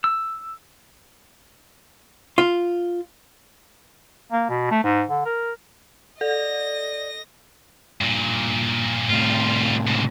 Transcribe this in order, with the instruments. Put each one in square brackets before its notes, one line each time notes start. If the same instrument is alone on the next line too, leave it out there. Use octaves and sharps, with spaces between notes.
[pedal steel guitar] E6
[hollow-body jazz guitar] F4
[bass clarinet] A#3
B2
A3
G#2
D3
A#4
[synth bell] A4 [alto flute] D5 [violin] D#5 A#6
[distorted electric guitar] G2 A#2
[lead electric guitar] A2 C3 [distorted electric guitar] G3 F4
[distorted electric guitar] G#2 C#3